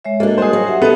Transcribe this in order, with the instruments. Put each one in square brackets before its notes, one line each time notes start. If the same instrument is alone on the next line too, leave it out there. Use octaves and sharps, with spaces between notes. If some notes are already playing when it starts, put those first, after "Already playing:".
[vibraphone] G#3 C#5 E5
[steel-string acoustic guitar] A#3 D4 [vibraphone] F#4 A4 D#5
[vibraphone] G3 F#4 D#5 [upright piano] G#4 C5
[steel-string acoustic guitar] F#3
[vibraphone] G4 E5 F#5
[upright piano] B3 [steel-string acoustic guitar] A4 D#5